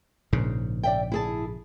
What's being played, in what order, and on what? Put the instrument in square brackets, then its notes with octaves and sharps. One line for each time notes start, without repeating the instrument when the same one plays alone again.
[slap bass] A#1 G#2 C#3
[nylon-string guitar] D5 E5 G5
E4 G#4 A5